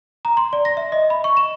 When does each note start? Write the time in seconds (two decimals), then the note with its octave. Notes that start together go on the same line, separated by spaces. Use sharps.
0.25 A#5
0.37 C6
0.53 D5
0.65 A#6
0.77 E5
0.92 D#5
1.10 B5
1.24 C#6
1.37 E7